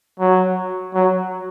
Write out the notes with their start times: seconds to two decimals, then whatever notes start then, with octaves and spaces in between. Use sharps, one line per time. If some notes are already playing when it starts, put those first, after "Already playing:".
0.20 F#3
0.94 F#3